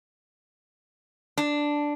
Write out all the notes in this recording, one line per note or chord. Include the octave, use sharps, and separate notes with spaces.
D4